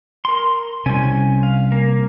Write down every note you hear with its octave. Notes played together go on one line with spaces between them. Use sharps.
A#4 C6
C3 G3 C#4 G#5
F5
A#3